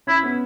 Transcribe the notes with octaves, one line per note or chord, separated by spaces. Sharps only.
C#4 E4
B3